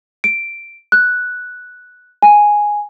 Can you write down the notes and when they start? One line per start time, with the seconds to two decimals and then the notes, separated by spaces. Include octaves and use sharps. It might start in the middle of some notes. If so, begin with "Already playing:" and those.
0.24 D7
0.92 F#6
2.22 G#5